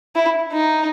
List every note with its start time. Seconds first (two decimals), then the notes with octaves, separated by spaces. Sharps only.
0.15 E4
0.52 D#4